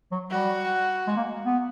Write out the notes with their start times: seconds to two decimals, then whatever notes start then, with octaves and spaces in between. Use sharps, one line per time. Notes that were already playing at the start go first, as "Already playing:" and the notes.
0.12 F#3
0.30 G3 F#4
1.07 G#3
1.17 A#3
1.45 B3